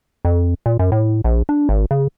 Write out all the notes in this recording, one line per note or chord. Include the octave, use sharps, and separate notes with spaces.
F2
A#2
F#2
A2
A#1
D4
G#1
C#3